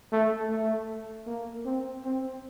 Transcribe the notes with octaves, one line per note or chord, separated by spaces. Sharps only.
A3
A3
A#3
C4
C4